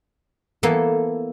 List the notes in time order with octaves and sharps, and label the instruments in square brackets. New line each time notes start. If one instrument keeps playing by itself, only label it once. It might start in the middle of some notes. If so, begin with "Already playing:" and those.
[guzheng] E3 A#3 B3 [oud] A4